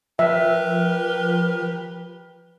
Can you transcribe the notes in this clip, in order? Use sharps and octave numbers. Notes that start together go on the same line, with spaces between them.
F3 G4 A#4 B4 E5